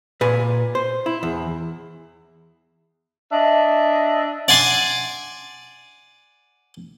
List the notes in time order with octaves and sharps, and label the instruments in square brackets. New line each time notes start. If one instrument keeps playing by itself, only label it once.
[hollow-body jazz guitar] A#2 B4 G#5
C5
E4
E2
[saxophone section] D4 D#5 E5
[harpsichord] D5 F#5 G#5 C6 D6